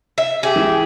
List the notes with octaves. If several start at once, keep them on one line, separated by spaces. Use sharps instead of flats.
E5
G4 G#4 E5
E3